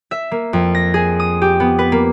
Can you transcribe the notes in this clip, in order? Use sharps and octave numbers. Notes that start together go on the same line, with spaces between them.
E5
A#3
F2
A#6
G#4
D#6
G4
B3
B4
A#3